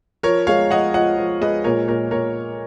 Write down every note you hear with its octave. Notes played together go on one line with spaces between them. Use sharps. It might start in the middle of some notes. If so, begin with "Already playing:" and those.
F3 A#4 C#5
G#3 C#5 F5
F3 D#5 F#5
F3 D#5 F#5
F3
G#3 B4 D#5
A#2 A#4 C#5
A#2 A#4 C#5
A#2 A#4 C#5